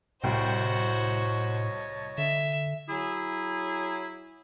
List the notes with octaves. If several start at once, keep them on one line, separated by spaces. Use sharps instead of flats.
C2 A2 F#4 C5 C#5 D#5 G5 A5
D3 E5
F#3 E4 G#4